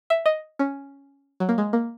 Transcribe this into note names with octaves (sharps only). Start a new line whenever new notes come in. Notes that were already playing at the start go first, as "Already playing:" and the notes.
E5
D#5
C#4
F#3
A#3
G#3
A#3